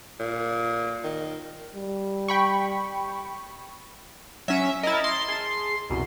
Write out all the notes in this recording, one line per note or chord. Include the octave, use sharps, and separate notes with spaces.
A#2
D#3
G3
G5 B5 C#6
F#3 C#4 E5
E4 A#4 D#5 A6
C6
G#4 A5
C2 F#2 B2